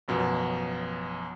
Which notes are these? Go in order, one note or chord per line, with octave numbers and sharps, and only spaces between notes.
A1 F#2 B2 F3